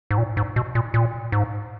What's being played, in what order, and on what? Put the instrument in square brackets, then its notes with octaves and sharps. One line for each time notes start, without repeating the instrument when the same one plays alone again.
[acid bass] G#2
A#2
G#2
B2
A#2
A#2
G#2